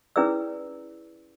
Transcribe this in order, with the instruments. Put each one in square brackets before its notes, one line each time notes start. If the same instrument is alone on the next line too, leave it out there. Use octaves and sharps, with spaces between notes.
[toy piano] C#4 E4 G#4 B4 D5 E6